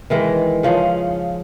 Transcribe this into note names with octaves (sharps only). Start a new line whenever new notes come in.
D#3 E3 G#3
C#3 F3 C#4 G#4